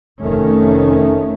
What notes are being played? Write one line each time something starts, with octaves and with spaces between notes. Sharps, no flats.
F1 D#3 A3 C#4